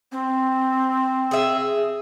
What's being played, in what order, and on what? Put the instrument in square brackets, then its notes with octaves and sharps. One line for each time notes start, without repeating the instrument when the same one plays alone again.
[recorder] C4
[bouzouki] G#4 E5